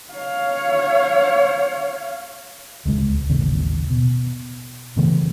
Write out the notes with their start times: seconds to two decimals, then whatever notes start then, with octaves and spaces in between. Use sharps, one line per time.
0.14 C#5 F5
2.85 D#1 C#2 G#3
3.29 D#1 A1 D#2 C#3
3.90 B2
4.96 A#2 C#3 E3 A3